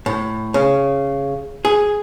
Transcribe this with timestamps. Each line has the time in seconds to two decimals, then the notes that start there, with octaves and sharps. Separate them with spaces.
0.06 A2
0.54 C#3
1.65 G#4